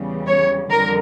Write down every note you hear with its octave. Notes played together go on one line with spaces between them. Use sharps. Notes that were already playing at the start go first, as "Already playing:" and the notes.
Already playing: E2 C#3 E3 G3
C#5
F2 D3 G3 A#4